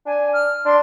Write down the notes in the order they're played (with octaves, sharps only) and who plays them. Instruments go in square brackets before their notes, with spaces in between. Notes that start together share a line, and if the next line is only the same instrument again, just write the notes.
[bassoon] D4 [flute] G#5
[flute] F6
[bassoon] D4 [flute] C6